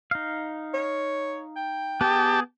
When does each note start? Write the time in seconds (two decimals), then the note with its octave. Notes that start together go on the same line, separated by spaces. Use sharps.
0.11 D#4 F5
0.74 C#5
1.56 G5
2.01 B3 G4 G#4 A5